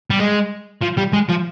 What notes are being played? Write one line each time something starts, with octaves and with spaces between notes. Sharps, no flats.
G3
G#3
F3
G3
G#3
F3